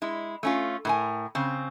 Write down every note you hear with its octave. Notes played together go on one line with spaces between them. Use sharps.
G#3 E4
A3 C#4 F4
A2 A#4 G#5
C#3 C4